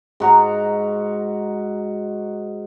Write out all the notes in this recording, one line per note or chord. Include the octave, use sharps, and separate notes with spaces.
G#2 F#4 A#5